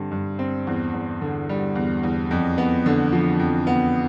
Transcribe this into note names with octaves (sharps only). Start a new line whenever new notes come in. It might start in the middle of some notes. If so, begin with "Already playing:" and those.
Already playing: G2 D3 G3 C4
G2
C4
E2
E2
D3
G3
E2
E2
F2
B3
D3
F3
F2
B3